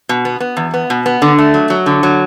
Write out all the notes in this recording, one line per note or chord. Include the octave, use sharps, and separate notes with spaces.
B2
B3
B3
E2
B3
B2
B3
D3
A3
F#3
F#3
D3
F#3